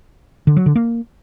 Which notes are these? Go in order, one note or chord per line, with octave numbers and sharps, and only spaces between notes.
D3
F#3
D3
A#3